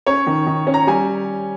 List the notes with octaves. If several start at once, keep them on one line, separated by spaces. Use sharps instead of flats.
C#4 C#5
D#3
D#3
C#4
A#5
G3 G#5